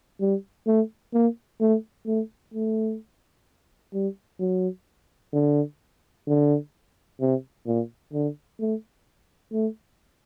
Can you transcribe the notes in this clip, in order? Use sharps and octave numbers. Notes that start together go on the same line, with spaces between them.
G3
A3
A#3
A3
A3
A3
G3
F#3
D3
D3
C3
A#2
D3
A3
A3